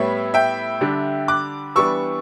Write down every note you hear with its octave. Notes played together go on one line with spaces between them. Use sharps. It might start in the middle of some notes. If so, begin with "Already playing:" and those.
Already playing: A2 G3 B3 C#5 E5
E5 G5
D3 G3 D4
D6 F#6
E3 G3 B3 D4 C#6 E6